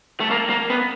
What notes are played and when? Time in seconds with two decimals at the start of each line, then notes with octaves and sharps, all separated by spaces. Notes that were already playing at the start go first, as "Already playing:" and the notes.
0.20 A3
0.31 A#3
0.50 A#3
0.70 B3